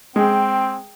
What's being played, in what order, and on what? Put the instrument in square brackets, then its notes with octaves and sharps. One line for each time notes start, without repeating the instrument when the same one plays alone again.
[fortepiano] G#3 [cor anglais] C4 [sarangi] G5